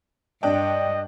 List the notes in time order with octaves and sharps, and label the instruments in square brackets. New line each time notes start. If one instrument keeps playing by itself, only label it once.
[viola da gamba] G2 [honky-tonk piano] D4 G5 [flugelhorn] D#5